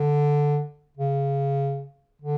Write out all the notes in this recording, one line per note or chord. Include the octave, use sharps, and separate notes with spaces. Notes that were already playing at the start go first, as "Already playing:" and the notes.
Already playing: D3
C#3
D3